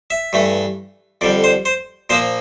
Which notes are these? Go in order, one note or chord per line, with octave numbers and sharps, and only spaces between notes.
E5
G2 E3 A3
F2 D3 G3 D5
C5
C5
A#2 F3 A#3 C5